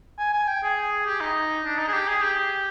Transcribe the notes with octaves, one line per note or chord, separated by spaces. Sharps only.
G#5
G#5
G5
G#4
G4
D#4
D4
D#4
G#4
G4
G#4
G4